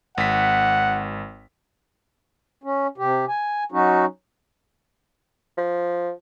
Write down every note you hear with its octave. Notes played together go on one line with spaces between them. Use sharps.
G#1 F#5 B6
C#4
C3 G4
G#5
F#3 C#4 D#4 F#4
F3